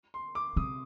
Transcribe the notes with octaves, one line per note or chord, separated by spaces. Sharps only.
C6
D6
C3 D#6